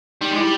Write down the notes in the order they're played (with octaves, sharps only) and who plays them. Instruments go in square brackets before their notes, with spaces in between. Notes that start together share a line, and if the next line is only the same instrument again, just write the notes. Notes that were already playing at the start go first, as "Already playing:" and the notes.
[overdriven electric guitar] G3 [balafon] D#4
[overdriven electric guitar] G#3
[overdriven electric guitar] G3 [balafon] E4